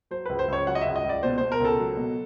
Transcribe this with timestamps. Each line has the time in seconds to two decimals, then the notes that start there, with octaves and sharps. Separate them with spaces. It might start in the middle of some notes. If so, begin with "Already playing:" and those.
0.11 F#3 C5
0.26 C#2 B4
0.39 C5
0.48 C#2 C#5
0.67 F#3 F#5
0.75 D#5
0.81 E5
0.86 C#2
0.96 D#5
1.04 C#2
1.09 D5
1.23 B2 C5
1.38 B2 C5
1.52 A#4
1.60 C#2 A4
1.80 F#3
1.97 B2